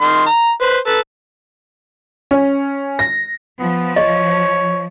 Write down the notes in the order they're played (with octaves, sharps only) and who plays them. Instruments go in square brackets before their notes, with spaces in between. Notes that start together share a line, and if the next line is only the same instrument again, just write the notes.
[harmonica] D#3 C6
A#5
B4 C5
A4 B4
[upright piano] C#4
A#6
[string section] F3 [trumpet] B3
[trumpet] C#5 [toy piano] D#5